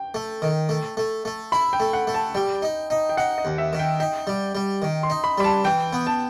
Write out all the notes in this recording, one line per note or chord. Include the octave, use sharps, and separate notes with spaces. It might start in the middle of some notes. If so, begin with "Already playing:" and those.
Already playing: G5
A3
D#3
A3
A3
A3
E4 B5
G5
A3
F#5
A3
A5
G3 G5
D#4
D#4
G5
D#4 F#5
D#5
D#2
E5
D#3
G5
D#4 G5
G3
G3
D#3
C6
D#4
B5
G3 B5
A5
E3 G5
B3
A5